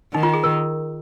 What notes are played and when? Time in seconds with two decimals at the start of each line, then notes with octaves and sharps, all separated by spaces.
0.14 D#3 D#4
0.23 F4
0.33 G#4
0.44 A#4